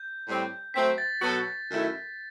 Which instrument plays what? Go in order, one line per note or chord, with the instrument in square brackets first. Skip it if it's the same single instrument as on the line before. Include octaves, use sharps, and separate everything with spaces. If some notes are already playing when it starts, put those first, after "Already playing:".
Already playing: [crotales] G6
[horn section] A2 G3 C4
[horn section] F#3 A3 C4 [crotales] B6
[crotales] A6
[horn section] B2 F#3 B3 F#4 A4
F#2 D#3 A3 E4